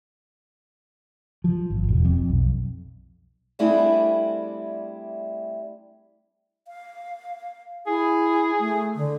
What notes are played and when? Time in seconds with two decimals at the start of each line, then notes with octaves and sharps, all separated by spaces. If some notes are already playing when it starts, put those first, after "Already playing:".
1.44 F3
1.70 G#1
1.88 E1
2.05 F2
2.29 B1
3.59 G3 A3 C4 D4 E4 G#4
6.68 F5
7.87 E4 G#4
8.59 A3
8.95 D3